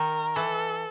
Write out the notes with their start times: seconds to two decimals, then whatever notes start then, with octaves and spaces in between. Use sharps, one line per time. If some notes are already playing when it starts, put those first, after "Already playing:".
Already playing: D#3 A#4
0.36 E3 A4